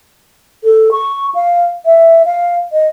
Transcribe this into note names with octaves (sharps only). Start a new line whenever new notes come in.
A4
C#6
F5
E5
F5
D#5